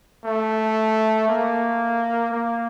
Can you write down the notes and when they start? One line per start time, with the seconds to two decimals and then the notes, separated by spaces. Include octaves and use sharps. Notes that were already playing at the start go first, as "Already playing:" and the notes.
0.25 A3
1.28 A#3
2.32 A#3